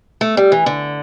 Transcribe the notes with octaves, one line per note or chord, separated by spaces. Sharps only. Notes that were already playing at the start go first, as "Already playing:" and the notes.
A3
G3
E3
D3